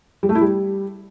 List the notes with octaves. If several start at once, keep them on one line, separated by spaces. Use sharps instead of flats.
G3
A3
E4
G3